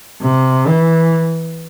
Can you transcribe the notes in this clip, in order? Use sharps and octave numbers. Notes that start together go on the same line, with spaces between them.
C3
E3